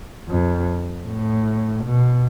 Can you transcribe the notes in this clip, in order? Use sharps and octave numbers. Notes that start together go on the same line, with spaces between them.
F2
A2
B2